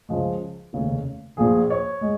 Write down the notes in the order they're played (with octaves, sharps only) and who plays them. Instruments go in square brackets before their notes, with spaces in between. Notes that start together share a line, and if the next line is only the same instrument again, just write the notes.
[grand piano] C#2 C#3 F3 G#3
F1 D#2 C#3
A#1 A#2 F3 G#4
C#5
G#3